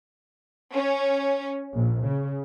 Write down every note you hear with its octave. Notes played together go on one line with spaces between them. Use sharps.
C#4
A#1
C#3